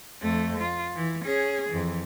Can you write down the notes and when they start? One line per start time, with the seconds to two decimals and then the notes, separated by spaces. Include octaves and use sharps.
0.22 F2 A3
0.61 F4
0.96 E3
1.25 C#4 G#4
1.70 F2 E3